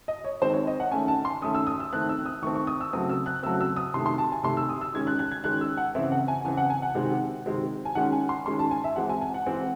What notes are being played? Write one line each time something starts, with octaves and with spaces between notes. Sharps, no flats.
D#5
C#5
D#3 G#3 C4 C5
C#5
D#5
F#5
D#3 A3 C#4 G#5
A5
C6
D#3 A3 C#4 D#6
E6
D#6
E6
D#3 A3 C4 F#6
E6
D#6
D#3 A3 C4 C#6
C#6
D#6
E6
C#3 F#3 A3 C4 D#6
E6
F#6
C#3 F#3 A3 C4 E6
E6
D#6
C3 D#3 A3 C6
C6
A5
G#5
C3 D#3 A3 C6
E6
D#6
E6
D#3 G#3 C#4 G#6
F#6
F#6
G#6
D#3 G#3 C#4 F#6
E6
F#5
C#3 E3 C4 E5
F#5
G#5
C#3 E3 C4 G#5
F#5
G#5
F#5
C3 D#3 G#3 C4
C3 D#3 G#3 C4
G#5
D#3 G#3 C#4 F#5
G#5
C6
D#3 G#3 C#4 C6
A5
G#5
E5
E3 G#3 C4 F#5
G#5
G#5
F#5
E3 G#3 C4